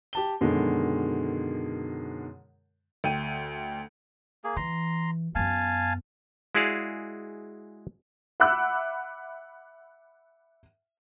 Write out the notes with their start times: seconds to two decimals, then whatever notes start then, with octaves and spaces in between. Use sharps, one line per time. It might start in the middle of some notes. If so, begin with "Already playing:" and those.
0.13 G4 A5 G7
0.41 F#2 B2 D3 D#3 G#3
3.04 D2 G5 D#7
4.44 A#3 G#4
4.56 E3 A#5 C6
5.35 F#2 B3 F5 G#5 A5
6.55 G#3 E4 F#4 G#4 D5 F5
8.40 E5 F#5 B5 D6 E6 F#6